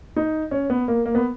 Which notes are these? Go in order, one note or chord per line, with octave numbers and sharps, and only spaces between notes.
D#4
C#4
B3
A#3
A#3
B3